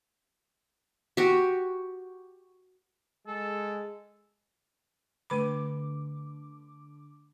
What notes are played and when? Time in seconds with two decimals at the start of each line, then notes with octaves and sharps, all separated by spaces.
1.17 F#4 G4
3.27 G#3 A4
5.30 D3 A3 B4 B5 D6